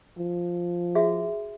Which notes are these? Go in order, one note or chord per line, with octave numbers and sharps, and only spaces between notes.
F3
F#4 G#4 E5